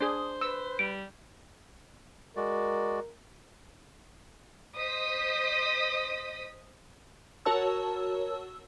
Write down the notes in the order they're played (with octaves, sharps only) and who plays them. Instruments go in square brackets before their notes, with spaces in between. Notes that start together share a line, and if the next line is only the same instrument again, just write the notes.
[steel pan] D4 G#4 [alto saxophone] C5 [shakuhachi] D#6
[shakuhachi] B4 [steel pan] E6
[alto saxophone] G3 [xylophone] D7
[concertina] G#3 F#4 D5 [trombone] A#4
[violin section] C5 D#5 D#6 B6
[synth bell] F#4 A#4 C#5 A5 E6